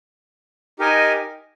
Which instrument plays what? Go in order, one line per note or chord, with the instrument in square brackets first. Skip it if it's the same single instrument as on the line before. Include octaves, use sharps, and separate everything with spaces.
[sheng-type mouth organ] D#4 G4 A#4 D#5 G#5